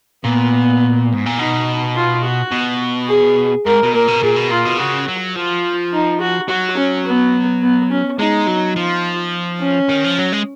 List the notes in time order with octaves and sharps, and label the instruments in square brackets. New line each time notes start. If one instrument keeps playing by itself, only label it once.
[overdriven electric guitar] A#2 [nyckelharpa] B3
[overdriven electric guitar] G#2
A#2
[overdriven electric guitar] B2 [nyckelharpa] D#4
[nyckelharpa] F4
F#4
[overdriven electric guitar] B2
[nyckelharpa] G#4
[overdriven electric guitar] G#2 [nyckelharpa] A#4
[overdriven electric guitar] B2
[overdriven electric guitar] A#2 [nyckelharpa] A#4
[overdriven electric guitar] B2
[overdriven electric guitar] A#2 [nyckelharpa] G#4
[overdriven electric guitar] B2
[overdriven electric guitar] A#2 [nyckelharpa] F4
[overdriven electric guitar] B2
[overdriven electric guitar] C#3 [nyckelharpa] F#4
[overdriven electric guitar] F#3
[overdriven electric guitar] F3 [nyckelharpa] F4
[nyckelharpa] D#4
F#4
[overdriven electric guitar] F#3 [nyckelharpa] F#4
[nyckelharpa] C#4
B3
B3
C#4
[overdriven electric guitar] G#3 [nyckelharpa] D#4
[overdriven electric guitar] F#3
[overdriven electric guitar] F3 [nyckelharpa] F4
[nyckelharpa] C#4
[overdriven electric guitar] D#3
F3
F#3
G#3